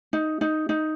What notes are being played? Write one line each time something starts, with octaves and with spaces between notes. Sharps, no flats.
D#4
D#4
D#4